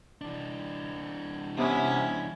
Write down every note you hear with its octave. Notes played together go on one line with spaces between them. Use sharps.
E3 D4
C3 B3 C#4 E4